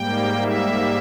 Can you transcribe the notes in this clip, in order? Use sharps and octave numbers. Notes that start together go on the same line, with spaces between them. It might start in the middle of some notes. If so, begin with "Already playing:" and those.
Already playing: G#2 G3 A#3 G5
E5